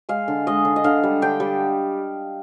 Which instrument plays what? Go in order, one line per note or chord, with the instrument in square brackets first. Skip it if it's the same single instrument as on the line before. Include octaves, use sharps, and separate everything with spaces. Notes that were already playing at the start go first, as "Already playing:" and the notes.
[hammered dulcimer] G#3 F5
D3
G#3 D#5
D3
D#5
D3 F5
G3
D3 G5
G3